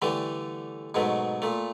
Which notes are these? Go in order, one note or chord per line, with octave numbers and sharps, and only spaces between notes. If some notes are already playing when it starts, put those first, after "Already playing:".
D3 E3 G3 A3
G#2 B2 F#3 A3
A#2 A3